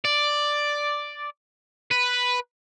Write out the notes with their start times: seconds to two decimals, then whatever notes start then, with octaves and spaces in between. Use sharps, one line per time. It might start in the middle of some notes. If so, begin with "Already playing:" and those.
0.05 D5
1.91 B4